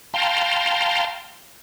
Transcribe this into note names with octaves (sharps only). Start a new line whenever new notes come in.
F5 G5 A5 A#5 C6